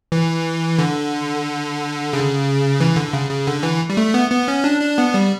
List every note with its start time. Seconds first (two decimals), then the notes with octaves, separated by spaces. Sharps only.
0.12 E3
0.78 D3
2.13 C#3
2.80 E3
2.96 D3
3.13 C#3
3.30 C#3
3.47 D3
3.63 E3
3.90 G3
3.97 A3
4.14 B3
4.30 B3
4.48 C#4
4.64 D4
4.81 D4
4.98 B3
5.14 G3